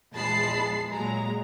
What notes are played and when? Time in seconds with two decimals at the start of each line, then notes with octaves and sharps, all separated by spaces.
0.14 A#1 E2 G#3 A5 B5 C7
0.90 A#2 F#3 G#3 A#5